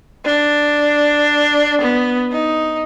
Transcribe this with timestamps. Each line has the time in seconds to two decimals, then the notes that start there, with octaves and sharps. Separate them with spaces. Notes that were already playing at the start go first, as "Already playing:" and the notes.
0.25 D4
1.81 B3
2.32 D#4